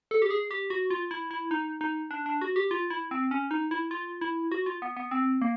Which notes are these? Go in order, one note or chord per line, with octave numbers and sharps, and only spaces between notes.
A4
G4
G#4
G4
F#4
F4
E4
E4
D#4
D#4
D4
D4
F#4
G4
F4
E4
C4
C#4
D#4
E4
F4
E4
F#4
F4
B3
B3
C4
A#3